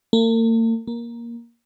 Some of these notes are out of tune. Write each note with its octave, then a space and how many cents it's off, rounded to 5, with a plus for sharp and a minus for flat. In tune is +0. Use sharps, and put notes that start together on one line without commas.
A#3 -45
A#3 +10